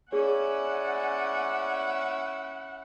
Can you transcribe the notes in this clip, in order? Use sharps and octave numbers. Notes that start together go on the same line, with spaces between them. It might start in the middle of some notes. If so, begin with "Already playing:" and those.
C#4 E4 G#4 C#5 D5 F#5 G#5